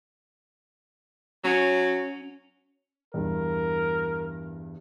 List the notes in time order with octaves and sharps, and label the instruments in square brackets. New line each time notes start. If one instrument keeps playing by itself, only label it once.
[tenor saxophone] F#3 [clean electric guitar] C#4
[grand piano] E2 G2 [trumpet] A#4